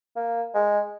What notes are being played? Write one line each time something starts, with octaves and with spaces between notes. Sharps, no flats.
A#3
G#3